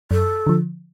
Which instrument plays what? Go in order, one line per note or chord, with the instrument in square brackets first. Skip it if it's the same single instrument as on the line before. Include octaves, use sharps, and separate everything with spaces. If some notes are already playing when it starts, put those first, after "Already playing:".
[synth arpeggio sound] F#2 [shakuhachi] A4
[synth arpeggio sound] D3 F3